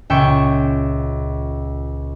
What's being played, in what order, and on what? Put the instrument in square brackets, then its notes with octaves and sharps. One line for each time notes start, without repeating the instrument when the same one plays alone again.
[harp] C#2 A#2 E5 G5 C#6